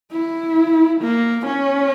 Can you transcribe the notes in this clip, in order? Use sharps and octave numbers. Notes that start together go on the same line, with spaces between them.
E4
A#3
C#4